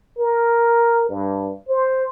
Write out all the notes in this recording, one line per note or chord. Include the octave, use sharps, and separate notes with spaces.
A#4
G2
C5